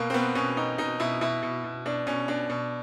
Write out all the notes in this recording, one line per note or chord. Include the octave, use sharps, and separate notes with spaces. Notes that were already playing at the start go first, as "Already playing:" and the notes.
Already playing: B2 A#3
C4
B2 B3
B2 C#4
B2 D#4
B2 D#4
B2 E4
B2 E4
B2
B2
B2 D4
B2 C#4
B2 D4
B2